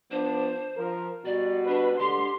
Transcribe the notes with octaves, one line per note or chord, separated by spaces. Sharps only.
F3 B3 D4 C5
F3 A#4
B2 G3 F#4 D5
D4 B4
D3 G4 C6